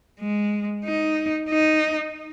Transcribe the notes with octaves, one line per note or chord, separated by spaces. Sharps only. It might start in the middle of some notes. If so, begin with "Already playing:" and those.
G#3
D#4
D#4